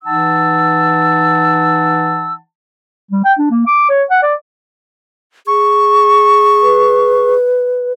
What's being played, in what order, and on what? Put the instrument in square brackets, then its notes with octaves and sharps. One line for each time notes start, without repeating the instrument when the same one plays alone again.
[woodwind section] E3 D#4 F#5 A5 E6
[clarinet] G3
G5
D4
A#3
D6
C#5
F#5
D5
[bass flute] G#4 [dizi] C#6
[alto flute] B4